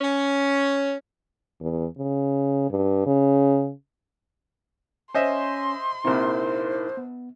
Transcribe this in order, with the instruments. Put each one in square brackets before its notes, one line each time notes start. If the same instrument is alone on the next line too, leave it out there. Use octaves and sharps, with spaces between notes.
[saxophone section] C#4
[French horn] E2
C#3
G2
C#3
[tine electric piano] C#4 [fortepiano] C5 D#5 E5 [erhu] C6
[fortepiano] A#1 C3 [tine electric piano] D#4 E4 A#4 [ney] C5
[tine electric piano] B3